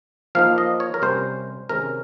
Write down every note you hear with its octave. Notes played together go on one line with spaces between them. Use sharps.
F3 A#3 D#4 F5
D#5
C#5
A#4
C3 G3 C#4 C5
C3 D#3 G#3 C#4 A#4